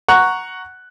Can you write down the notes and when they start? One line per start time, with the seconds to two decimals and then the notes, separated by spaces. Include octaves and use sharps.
0.08 F#5 A#5 C#6 F#6